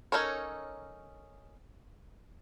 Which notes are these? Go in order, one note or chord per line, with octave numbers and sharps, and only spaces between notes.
C#4 D#4 A4 A#4 C#5